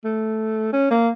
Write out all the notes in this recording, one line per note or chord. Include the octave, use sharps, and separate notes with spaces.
A3
C#4
A#3